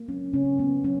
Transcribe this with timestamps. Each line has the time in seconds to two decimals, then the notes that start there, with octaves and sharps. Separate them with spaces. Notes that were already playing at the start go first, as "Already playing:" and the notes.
Already playing: A#3
0.08 F#3 C#4
0.33 C#3 C#4
0.58 A#3 B3
0.84 F#3 C#4